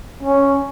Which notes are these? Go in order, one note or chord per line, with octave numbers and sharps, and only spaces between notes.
C#4